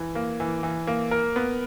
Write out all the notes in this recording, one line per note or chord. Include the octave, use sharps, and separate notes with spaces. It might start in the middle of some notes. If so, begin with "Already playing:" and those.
Already playing: E3
A#3
E3
E3
A#3
A#4
B3